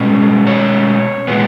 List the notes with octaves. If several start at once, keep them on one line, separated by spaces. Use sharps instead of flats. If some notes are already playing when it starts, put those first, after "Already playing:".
Already playing: B2 G#3 C#4
C#5
A#2 G#3 B3